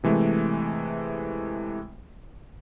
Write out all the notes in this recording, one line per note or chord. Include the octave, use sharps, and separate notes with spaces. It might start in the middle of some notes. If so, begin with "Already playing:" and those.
C3 E3 G#3 A3